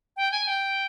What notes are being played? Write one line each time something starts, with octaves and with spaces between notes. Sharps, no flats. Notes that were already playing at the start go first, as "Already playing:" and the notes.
G5
G#5
G5